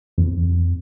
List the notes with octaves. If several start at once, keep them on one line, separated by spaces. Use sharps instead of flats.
F2